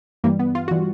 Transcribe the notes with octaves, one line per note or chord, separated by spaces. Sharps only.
G2 E3 G3 A#3
B3
F4
E3 G3 F#4